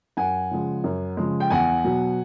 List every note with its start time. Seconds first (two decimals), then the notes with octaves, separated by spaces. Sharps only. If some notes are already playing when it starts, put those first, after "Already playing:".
0.17 F#2 F#5 G#5
0.51 C#3 F3 G#3
0.84 F#2
1.17 C#3 F3 G#3
1.40 G5
1.50 E2 F#5 G#5
1.85 B2 F#3